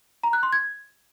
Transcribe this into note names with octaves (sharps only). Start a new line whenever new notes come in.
A#5
F#6
C6
G#6